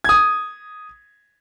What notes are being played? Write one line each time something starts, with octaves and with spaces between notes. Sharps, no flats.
D#6 G#6